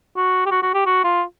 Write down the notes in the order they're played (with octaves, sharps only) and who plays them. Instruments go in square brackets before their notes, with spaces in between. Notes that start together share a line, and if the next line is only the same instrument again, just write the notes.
[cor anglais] F#4
G4
F#4
F#4
G4
F#4
F4